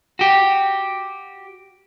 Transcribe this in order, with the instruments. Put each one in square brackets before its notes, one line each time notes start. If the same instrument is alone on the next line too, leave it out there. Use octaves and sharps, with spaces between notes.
[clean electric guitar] F#4 G4